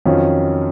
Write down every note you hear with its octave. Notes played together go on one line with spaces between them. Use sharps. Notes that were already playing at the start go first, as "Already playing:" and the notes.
F2 D#3 F#3 C#4 F4